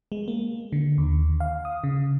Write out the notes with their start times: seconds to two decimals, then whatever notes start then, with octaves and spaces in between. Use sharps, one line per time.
0.12 G#3
0.28 A#3
0.72 D3
0.98 D#2
1.40 F5
1.65 D#6
1.84 C#3